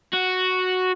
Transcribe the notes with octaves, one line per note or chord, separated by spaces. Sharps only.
F#4